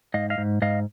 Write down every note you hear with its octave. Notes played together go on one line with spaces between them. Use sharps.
G#2 D#5 F5
D#5 F5
G#2
G#2 D#5 F5